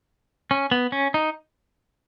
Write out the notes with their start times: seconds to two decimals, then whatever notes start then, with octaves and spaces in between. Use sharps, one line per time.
0.51 C#4
0.71 B3
0.92 C#4
1.14 D#4